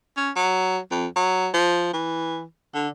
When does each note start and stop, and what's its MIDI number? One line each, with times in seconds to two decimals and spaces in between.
0.17 0.30 61
0.36 0.78 54
0.91 1.06 41
1.16 1.48 54
1.54 1.89 53
1.93 2.44 52
2.74 2.88 50